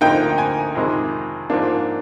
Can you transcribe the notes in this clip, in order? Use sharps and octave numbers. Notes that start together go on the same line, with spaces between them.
D2 D3 F3 A#3 D#4 G5
G#5
F2 C3 D#3 G#3
G#2 F3 A#3 D4